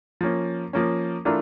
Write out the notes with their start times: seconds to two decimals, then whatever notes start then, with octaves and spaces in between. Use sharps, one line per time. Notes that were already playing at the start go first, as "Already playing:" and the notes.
0.21 F3 A#3 C#4
0.73 F3 A#3 C#4
1.25 E3 A3 D4 F4 A#4